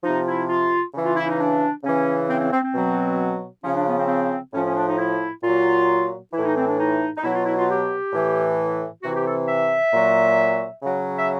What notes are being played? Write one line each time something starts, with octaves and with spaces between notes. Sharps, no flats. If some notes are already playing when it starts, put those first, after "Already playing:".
C3 F3 D#4
E4
F4
C#3 E3
F4
E4
D#4
D4
C#3 E3 C#4
C4
C4
C4
C4
B2 F#3
C#3 F3 C#4
D4
B3
C4
C4
A2 F3 C#4
C#4
D4
D#4
E4
A#2 F#3 F4
A2 E3 E4
D#4
C4
D4
D#4
D#4
B2 F#3 E4
F4
E4
F4
G4
A2 E3
C3 E3 F#4
G4
A4
E5
A#2 F#3
C#3 F#3
E5